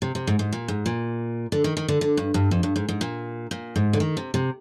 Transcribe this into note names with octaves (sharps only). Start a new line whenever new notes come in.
C3
C3
G#2
G#2
A#2
G#2
A#2
D3
D#3
D#3
D3
D3
G2
G2
F2
G2
G#2
G#2
A#2
A#2
G#2
D3
D#3
C3
C3